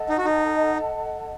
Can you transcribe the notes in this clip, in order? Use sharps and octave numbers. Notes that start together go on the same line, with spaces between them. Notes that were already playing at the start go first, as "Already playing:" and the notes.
Already playing: A4 D#5 F#5 A5
D#4
F#4
D#4